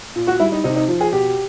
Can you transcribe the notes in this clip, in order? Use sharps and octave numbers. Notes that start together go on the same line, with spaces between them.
A#2
F#4
G3 E4
D#4
C3 D#4
D#4
F3
G#4
B2 G4